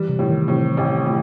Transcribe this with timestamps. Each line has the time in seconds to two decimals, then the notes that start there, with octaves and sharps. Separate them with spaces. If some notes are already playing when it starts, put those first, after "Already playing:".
Already playing: E3 G3
0.09 C3
0.19 A2
0.29 D#3
0.48 A2 C3
0.77 A1
1.06 A2